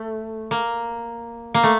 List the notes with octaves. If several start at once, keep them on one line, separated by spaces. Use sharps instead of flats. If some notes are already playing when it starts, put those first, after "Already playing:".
Already playing: A3
A#3
A#3
A3